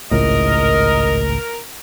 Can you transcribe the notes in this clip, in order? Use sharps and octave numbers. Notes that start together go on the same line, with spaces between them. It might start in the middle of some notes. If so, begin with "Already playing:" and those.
G#1 C#2 A2 A#4 D#5